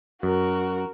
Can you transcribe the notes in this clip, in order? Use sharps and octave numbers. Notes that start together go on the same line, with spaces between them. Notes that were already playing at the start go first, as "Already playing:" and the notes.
F#2 F#4 A#4